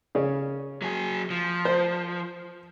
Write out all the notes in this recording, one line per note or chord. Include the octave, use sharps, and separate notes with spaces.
C#3 C#4
F#3 G#4
F3
C5